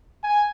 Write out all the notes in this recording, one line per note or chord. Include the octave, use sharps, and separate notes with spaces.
G#5